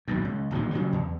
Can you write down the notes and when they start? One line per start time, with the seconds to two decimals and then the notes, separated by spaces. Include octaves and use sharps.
0.08 D#1 B1 F#2
0.25 C#2
0.51 D1 A#1 D#3 F3
0.71 C#3 F#3 G3
0.93 E2